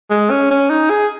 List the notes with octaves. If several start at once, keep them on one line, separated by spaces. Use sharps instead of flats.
G#3
C#4
C#4
D#4
G#4